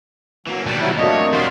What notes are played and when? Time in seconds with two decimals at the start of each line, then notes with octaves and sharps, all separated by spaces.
0.47 E3 F#3 A#3
0.66 D#2 B2 G3 F#4 A5
0.80 C3 F#3 E4
0.98 F2 F#3 A3 A#3 D4 C#5 D#5
1.33 E2 G3 D4 F#4 F5 C6